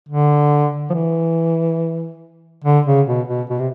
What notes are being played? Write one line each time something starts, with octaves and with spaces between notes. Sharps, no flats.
D3
F3
E3
D3
C#3
B2
B2
B2
C3